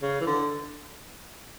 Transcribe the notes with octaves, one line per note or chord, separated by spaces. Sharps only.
C#3
E3
D3